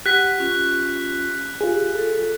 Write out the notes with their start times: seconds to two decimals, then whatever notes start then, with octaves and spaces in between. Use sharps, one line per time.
0.06 G4 F#5 F#6 B6
0.38 C#4 F4
1.61 F4 G4 G#4
1.94 A4